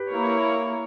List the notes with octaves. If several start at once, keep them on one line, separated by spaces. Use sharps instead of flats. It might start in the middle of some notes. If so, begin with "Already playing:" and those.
Already playing: G4 B4
A#3 E4 A#4 C#5